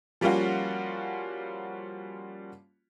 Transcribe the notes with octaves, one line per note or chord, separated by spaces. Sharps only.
F3 G3 A#3 C#4 F4 F#4